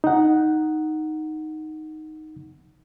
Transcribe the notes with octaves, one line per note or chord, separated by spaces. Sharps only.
D#4 F#5